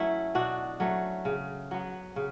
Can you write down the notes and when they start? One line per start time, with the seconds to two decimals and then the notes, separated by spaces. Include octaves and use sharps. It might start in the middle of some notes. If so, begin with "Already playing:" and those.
Already playing: F#3 A3 C#4 E4
0.35 B2 D4 F#4
0.80 F#3 A3 C#4
1.25 C#3
1.71 F#3 B3
2.16 C#3